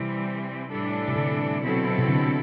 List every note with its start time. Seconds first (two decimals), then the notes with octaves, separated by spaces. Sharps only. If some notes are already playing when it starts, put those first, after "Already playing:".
Already playing: C3 E3 G3 C4
0.70 A2 E3 G3 D4 A4
1.08 C3
1.16 D3
1.62 B2 F#3 C4 E4 A4
1.98 C3
2.08 D3